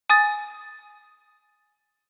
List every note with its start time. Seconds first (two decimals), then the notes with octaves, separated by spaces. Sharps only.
0.10 G#5 D#6 A6